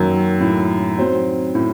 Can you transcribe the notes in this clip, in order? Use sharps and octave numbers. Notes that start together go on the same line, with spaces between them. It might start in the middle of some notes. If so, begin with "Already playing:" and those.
Already playing: F#2 D#3 F#3 A#3
A2
F#3 C4 D#4 F#4 C5
A2